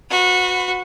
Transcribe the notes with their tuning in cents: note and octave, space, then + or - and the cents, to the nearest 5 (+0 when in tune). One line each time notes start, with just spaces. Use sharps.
F#4 -20 B4 +20